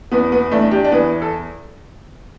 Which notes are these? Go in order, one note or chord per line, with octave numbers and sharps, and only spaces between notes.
E2 B3
B3
E2 A3 D4
D4 G4
D4
E3 B3
A4